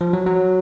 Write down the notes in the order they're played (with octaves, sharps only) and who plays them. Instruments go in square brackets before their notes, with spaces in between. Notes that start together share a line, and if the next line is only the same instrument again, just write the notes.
[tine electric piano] F3
F#3
F#3